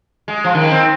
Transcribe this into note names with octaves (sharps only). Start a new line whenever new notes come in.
G#3
F3
D#3
C4